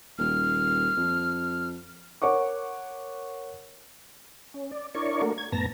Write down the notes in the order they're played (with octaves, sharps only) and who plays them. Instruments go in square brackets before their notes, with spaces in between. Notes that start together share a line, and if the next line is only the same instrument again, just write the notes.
[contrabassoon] D#1 [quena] F6
[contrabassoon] F2
[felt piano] A#4 C#5 F#5 C#6 D6
[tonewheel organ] C#4
D5
D4 E4 A#4 C#5 D5 C#6
A3 A#3 D4 F#4 A#4
G#6
F#2 A2 B3 A5 A#5 A#6